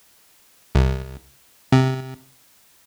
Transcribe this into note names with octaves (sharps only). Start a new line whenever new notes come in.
C2
C3